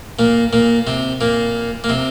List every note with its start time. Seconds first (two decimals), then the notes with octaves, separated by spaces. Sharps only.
0.19 A#2 A#3
0.53 A#2 A#3
0.87 C3 C4
1.21 A#2 A#3
1.84 A#3
1.89 C3 C4